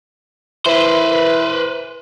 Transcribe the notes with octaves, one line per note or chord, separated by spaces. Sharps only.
E3 B4 C5